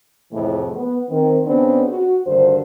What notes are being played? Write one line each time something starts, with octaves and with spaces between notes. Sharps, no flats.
F2 A2 C3 E3 G#3 A3
B3
D#3 C4
C#3 B3 C4 D4
F#4
D2 G2 D3 D#3 C5